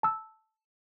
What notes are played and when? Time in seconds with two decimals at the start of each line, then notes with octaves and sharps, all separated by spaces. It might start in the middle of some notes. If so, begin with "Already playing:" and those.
0.03 A5 E6